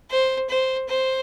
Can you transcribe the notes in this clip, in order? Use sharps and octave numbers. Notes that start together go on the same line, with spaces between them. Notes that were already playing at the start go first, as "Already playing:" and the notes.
C5
C5
C5